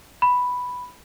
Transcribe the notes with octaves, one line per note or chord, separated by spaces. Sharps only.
B5